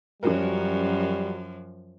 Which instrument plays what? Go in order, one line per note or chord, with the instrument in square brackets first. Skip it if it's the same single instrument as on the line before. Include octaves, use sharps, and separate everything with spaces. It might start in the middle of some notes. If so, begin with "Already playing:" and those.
[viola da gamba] F#2 F3 [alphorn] G3 [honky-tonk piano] C#4 F#4 A#4